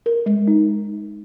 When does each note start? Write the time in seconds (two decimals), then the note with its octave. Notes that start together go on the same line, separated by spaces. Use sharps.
0.06 A#4
0.26 G#3
0.48 D#4